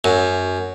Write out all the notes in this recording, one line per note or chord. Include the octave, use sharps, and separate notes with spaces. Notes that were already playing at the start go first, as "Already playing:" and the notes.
F#2